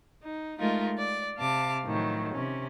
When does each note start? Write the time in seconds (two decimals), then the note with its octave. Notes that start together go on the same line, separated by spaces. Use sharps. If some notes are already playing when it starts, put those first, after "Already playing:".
0.24 D#4
0.59 G#3 A3 D#4 F4 A#4
0.97 D5
1.38 C3 F5 A5 D6
1.84 A2 D#3 F3 F#3
2.33 C3 C#4